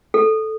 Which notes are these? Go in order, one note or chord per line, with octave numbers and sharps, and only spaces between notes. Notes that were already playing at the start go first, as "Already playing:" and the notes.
A4